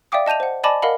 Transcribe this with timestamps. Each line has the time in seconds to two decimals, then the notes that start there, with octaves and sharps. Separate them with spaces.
0.12 D5 E5 F5 G5 D6 D#6
0.26 D#5 A5 G6 D#7 F7
0.40 C5 F#5
0.64 D5 D#5 G#5 A5 B5 D6
0.82 A#4 D#5 F5 F#5 B5